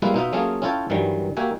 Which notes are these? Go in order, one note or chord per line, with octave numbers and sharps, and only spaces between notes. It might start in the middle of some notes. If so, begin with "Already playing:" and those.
G3 G#3 A#3 E4 F4 B4
B2 D#4 F4 E5
F#3 A3 A#3 C#4 F4 G#4
C#4 E4 F4 A4 C#5 G5
G2 D#3 E3 F#3 G3
A#3 F#4 G4 E5 G#5